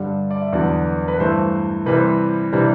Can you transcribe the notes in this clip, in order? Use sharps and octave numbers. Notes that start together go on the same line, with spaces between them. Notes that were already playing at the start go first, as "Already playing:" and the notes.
Already playing: G2 D3 G3 D4
D5
E5
E2 D3 F#3 B3 D5
B4
G2 E3 A3 C5
C3 E3 G3 B4
C5
C3 E3 G3 D4